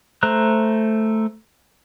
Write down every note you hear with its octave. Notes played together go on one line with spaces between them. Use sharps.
A3 C5 A#5 F#6